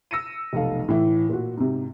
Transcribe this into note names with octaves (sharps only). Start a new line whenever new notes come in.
E6 A#6 C#7 D#7
F1 B1 A4 F5
A2 E3
A#2 F#4
G#2 C3